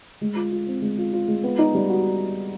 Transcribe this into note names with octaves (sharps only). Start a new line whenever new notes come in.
G#3
F4
F4
C4
G#3
F4
F4
G#3
B3
D#4
G3
F#4